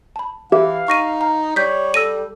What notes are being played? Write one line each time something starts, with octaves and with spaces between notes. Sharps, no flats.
A5 B5
E3 G4 E5 F5
D#4 C#6 A#6 D#7
A#5
G3 C#5 G6 B6
A4 E6 A#6 D#7